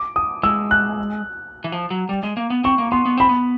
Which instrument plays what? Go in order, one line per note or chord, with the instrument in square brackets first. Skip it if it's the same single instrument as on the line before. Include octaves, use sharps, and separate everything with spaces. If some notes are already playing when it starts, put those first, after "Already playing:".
Already playing: [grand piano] D6
D#6
[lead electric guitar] G#3 [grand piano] E6
[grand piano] F#6
[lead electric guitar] E3
F3
F#3
G3
G#3
A#3
B3
[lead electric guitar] C4 [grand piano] C#6
[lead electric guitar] A#3
[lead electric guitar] B3 [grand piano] C6
[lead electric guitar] B3
[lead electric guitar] C4 [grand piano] B5
[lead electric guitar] B3